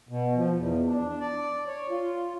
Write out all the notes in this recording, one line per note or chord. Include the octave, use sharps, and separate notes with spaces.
B2
F3
E2
D4
D5
C#5
F4